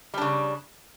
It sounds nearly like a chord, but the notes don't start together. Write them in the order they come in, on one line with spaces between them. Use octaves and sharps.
G3 D4 C#3